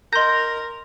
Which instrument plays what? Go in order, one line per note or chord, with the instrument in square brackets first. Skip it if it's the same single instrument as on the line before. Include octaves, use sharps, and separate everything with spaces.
[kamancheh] A#4 [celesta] D#5 A#5 [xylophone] C6 G6 [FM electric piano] A#6